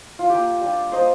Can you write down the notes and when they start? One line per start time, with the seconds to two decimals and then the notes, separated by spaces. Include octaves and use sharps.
0.19 F4
0.29 A#3 F4 G4
0.61 G3 D4 F4
0.92 A#3 F4 C5 D#5